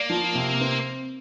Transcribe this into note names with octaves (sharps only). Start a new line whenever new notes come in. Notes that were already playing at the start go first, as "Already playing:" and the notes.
Already playing: A#3 D5
F3
C3
C4